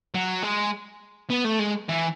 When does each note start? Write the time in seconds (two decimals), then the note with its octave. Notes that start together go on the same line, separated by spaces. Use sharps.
0.15 F#3
0.43 G#3
1.30 B3
1.44 A3
1.59 G#3
1.89 E3